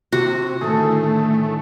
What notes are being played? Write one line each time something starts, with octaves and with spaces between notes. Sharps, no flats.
C3 F#4
A2 D3 D#3 A3 G#4 A4